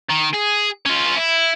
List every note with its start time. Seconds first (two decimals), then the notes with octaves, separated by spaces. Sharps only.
0.09 D#3
0.33 G#4
0.86 C#4 F4
1.17 E4